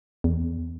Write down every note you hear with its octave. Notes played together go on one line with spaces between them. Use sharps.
E2